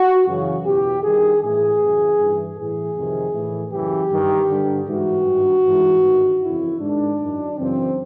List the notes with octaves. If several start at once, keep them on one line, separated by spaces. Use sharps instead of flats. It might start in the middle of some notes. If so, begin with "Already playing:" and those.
Already playing: F#4
F#2 C#3 E3
E2 B2 G4
G2 D#3 G#4
A2 E3 G#4
F#2 C#3 E3
G2 E3
A2 E3 G#4
F2 C3 D#3
A2 E3
F#2 C#3 E3 G4
G2 D#3
G2 D3
G#2 E3 F#4
G2 D#3
G#2 E3
G2 D#3
F2 C#3 E3 E4
G#2 D#3 D4
F#2 D#3
F#2 C#3 E3 C4